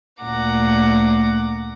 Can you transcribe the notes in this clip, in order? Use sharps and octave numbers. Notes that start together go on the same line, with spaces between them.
D2 A#2 F#5 A#5 D6